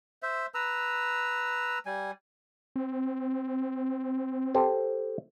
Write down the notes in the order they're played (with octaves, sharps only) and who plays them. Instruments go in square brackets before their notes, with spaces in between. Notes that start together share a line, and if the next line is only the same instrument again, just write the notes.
[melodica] C5 E5
B4 A#5 E6
G3 G#5
[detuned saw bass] C4
[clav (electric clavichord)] G4 A4 C5